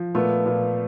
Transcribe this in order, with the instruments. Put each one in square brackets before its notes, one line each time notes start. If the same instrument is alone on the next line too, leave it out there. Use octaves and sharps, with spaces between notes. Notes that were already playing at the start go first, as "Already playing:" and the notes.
Already playing: [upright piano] F3
A#2 A3 B3
A#2